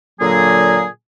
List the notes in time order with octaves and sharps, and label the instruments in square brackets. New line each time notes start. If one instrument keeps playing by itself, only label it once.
[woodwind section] A#2 D3 F#3 A#3 G#4